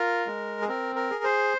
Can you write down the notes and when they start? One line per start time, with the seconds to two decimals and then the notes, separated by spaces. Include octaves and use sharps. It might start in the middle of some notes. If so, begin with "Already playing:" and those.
Already playing: F4 A#4
0.26 G#3
0.61 G#4
0.68 C4 A#4
0.96 A#4
1.10 G#4
1.24 C5